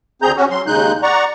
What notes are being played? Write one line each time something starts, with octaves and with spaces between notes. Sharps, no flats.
D2 C4 G#4 A#5 G6
C#4 F#4
F#3 C6
D#2 C#3 G#3 D#4 F#6 G6
D5 F#5 A#5 C#6